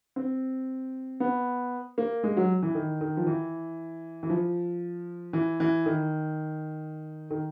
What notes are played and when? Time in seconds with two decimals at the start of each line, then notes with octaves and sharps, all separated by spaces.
0.16 C4
1.20 B3
1.98 A#3
2.24 G#3
2.37 F#3
2.63 E3
2.75 D#3
3.01 D#3
3.17 F3
3.27 E3
4.23 E3
4.30 F3
5.33 E3
5.60 E3
5.86 D#3
7.31 D#3